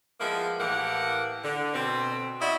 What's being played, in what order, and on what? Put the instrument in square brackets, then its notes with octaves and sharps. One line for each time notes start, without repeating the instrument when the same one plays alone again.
[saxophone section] F3 G#3 A#3 B3 E4
A2 E3 A#3 G4 F#5
D3
B2 C4
E4 F#4 D5 D#5